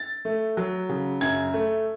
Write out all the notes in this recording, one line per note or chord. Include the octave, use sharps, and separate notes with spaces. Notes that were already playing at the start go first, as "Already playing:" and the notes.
Already playing: A6
A3
F#3
C#3
F#2 G#6
A3